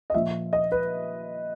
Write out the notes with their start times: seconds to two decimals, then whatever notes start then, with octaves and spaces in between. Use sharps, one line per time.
0.10 D#5
0.14 A#2 F3 E5
0.53 D#5
0.72 B4